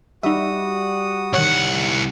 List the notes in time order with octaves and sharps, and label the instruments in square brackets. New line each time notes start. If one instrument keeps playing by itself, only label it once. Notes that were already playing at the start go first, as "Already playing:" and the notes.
[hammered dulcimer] G3 [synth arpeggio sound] D#4 E5 [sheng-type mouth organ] F#4 D#6
[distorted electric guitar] C2 F#5 [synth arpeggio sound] D#3 C#5